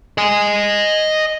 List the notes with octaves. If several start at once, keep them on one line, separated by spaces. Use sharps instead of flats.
D#5 G#5